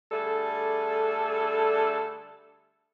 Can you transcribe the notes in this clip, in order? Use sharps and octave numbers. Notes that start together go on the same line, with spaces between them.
D3 G3 A3 D4 G#4 A4